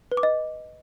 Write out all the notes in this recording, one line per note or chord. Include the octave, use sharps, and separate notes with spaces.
B4
D6
D#5